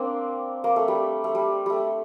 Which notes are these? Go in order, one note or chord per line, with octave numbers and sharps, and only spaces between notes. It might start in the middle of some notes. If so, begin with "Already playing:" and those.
Already playing: A#3 C4 D4
A#3
A3
G3
A3
G3
G3 A3